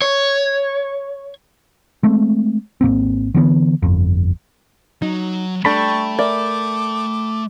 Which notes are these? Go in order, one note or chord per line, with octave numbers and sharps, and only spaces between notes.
C#5
G#3 A3 C4
G#1 A2 A#3 C4
D3 E3 A#3 B3
G1 F2
F#3 D#4
G3 A3 D4 A4 G5 A5 B5 C#6
A#4 D5 E5 D6